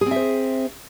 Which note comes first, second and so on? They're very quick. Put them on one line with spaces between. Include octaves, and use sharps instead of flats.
G#4 C4 E5 C5